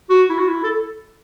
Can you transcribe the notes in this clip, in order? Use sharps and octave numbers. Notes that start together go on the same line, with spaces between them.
F#4
E4
F#4
E4
A4